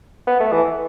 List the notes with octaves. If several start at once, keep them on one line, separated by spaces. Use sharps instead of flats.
B3
A3
E3